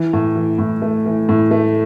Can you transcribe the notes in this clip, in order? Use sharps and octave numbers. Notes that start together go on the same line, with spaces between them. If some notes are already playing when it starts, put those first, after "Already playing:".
Already playing: E3
A2
E3
A2
A3
E3
A2
A3